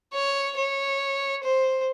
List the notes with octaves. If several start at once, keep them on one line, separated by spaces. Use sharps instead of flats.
C#5
C#5
C5